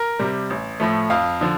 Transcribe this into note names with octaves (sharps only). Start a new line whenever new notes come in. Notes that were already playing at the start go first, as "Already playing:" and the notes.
Already playing: A#4
C3 G3
A1
A2 F3 A3
F2 F5
D3 F3